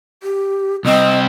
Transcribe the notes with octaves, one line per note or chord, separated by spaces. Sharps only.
G4
C2 C4 D#5